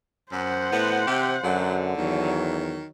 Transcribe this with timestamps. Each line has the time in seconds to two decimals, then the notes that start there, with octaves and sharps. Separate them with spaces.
0.32 F#2 C5 F#5
0.72 A2 B3
1.07 C3 G4
1.44 F#2 D3 F#3
1.97 E2 D#3 F#3